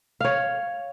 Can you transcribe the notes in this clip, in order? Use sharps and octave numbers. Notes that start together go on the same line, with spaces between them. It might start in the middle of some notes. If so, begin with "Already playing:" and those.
C#5 F5